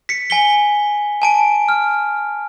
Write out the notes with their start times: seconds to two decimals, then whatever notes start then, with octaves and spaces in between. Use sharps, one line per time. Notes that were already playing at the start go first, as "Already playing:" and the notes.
0.09 B6 C#7
0.30 G#5 B6 G7
1.22 G#5 A5 D7
1.69 F6